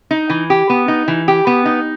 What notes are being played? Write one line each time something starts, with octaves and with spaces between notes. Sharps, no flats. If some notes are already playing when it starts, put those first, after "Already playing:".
D#4
E3
G4
B3
D#4
E3
G4
B3
D#4